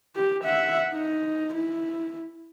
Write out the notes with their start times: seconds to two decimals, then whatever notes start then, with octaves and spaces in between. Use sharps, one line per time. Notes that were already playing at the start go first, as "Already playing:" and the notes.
0.16 G4
0.44 E5 F#5
0.93 D#4
1.55 E4